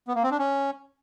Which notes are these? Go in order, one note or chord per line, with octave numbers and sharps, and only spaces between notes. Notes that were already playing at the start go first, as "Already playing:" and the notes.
B3
A#3
C4
D4
C#4